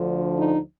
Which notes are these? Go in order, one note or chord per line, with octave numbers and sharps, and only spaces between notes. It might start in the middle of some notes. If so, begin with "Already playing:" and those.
Already playing: D2 D3 F3
D#4